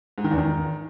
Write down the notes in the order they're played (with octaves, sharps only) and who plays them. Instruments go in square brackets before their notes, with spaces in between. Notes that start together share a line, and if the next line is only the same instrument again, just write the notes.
[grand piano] G#2
D#3
E2
D#3